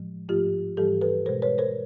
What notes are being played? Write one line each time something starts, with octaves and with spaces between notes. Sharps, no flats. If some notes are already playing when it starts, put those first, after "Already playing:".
Already playing: A2 F3 G#3
G#2 F3 A3 F4 G4
G#2 E3 G3 G4 A4
A4 B4
B2 G#3 A#4 C5
B4 C#5
A#4 C5